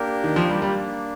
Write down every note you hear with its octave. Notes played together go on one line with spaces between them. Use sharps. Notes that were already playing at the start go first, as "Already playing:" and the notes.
Already playing: A#3 D4 G4 A#4
D#3
F3
G3
G3 A#3 D4